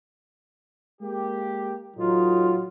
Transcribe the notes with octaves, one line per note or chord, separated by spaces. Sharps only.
G#3 A#3 G4
A2 E3 F#3 D#4 F4